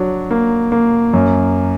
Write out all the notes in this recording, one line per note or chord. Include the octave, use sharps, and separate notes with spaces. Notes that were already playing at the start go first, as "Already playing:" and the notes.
Already playing: F#3 D4
A#3
A#3
F#2